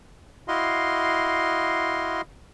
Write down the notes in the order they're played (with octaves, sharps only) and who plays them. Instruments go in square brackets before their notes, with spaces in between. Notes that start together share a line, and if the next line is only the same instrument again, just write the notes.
[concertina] E4 F#4 D#5 F5 C6